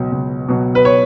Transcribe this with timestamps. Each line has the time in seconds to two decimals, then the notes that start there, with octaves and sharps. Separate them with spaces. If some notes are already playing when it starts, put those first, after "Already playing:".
Already playing: C#2 B2 F#3
0.12 C#2
0.48 B2 F#3
0.75 B4
0.85 C#5